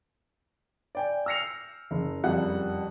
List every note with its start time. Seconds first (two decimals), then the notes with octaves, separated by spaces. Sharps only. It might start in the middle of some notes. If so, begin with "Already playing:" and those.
0.95 D5 G5 G#5
1.26 E6 F6 A#6 C7 C#7 F7
1.91 F#1
2.23 F#1 F2 G3 F#5 F#6